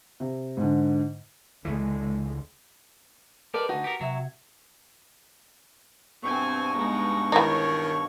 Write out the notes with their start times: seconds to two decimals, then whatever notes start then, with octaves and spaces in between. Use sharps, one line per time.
0.20 C3
0.57 G#2 D3
1.65 C#2 D3 E3 G#3
3.54 G4 A#4 B4 D5 D#5 A5
3.69 D2 D#4 F#4 F#5 A5
3.84 G4 A#4 D#6 C#7
4.01 C3 F#3 E5 G#6
6.23 G2 B2 C4 G#5 C#6
6.75 G#3 B3 D#4
7.32 D#3 E3 D#4 G#4 C#5